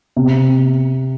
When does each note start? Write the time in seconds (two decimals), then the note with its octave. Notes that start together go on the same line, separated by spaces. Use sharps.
0.16 C3